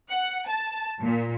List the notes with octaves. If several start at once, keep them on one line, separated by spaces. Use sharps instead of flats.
F#5
A5
A#2